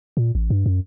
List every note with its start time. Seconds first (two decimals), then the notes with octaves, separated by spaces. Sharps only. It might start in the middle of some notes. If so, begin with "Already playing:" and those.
0.17 A#2
0.35 A1
0.50 G2
0.66 F#2